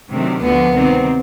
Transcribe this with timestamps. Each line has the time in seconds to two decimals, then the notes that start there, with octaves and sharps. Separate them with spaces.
0.10 C3 D#3 F#3 A3 D4
0.41 D2 D3 F3 A3 B3
0.73 C3 D#3 G3 C4